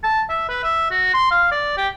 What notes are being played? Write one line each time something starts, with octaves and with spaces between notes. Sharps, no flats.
A5
E5
B4
E5
F#4
C6
F5
D5
G4